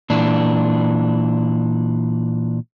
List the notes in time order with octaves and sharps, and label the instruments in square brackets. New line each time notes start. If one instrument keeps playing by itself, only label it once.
[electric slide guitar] A#2 E3 D4